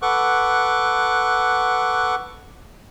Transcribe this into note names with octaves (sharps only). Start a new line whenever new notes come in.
A4 B4 F#5 C#6 D6 F#6